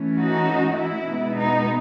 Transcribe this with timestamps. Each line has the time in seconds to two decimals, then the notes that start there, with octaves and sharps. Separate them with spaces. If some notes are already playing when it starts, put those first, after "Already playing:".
Already playing: E3 A3 C#4
0.18 D#4 F#4
0.77 E4
1.06 B2 G#3 B3
1.36 D#4